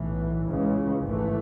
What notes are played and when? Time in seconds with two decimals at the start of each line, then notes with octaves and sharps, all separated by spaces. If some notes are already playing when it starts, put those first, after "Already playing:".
Already playing: B1 A2 E3
0.48 C#2 C#3 E3 G#3
1.04 G#1 G#2 E3 A3